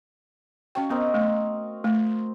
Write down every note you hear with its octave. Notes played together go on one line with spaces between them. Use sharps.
C#4 F#4 C#5 F5 G5
B3 C4 A#4 D#5
A3
A3